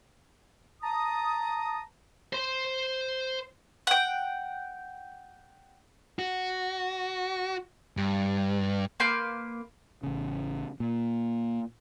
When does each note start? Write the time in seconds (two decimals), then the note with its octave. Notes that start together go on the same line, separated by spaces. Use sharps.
0.83 A5 A#5 D#6
2.33 C5 C6
3.87 F#5 G5
6.19 F#4
7.97 G2
9.00 A#3 B4 C6 G6
10.03 A1 C#3
10.80 A#2